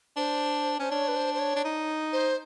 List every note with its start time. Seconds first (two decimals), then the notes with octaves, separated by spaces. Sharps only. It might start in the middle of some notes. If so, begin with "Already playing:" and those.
0.16 D4 C5
0.79 C#4 C5
0.90 D4 C#5
1.08 B4
1.16 C5
1.34 C5
1.39 C#5
1.56 D4
1.64 D#4
2.13 C5